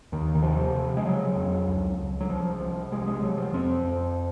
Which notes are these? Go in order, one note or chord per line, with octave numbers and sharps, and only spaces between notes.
D#2 D#3
D#3
C3 F3
C3
G#3
C#3 F#3
F2
C#2
C#2
F#3
C2 F3
C2 F3
C3 G#3
G#3
C3 F#3
F3
F2 C4
F2